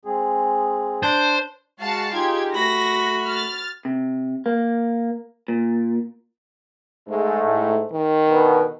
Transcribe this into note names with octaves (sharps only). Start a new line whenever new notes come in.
G#3 C4 G#4
D4 C5
G#3 F#4 F5 A5
D#4 F4 G4 G#4 G#6
A3 F#4 B5 A#6
F6 A6
C3
A#3
A#2
G#2 G#3 A3
A2
D#3
B2 D3 B3